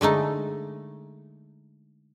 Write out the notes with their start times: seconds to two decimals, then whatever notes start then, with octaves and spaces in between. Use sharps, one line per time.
0.01 D3 G#3 A3 D#4